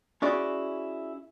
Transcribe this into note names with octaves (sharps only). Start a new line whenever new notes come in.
C#4 E4 F#4 G#4 D5